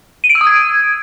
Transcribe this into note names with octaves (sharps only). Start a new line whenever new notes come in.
D#7
D7
E6
D#6
G#6